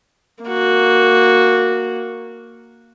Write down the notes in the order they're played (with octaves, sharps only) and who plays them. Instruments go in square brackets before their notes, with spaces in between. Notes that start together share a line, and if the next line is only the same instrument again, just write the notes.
[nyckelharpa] A#3 F#4